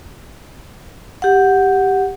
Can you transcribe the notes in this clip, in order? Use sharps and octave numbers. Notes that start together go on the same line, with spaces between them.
G4 F#5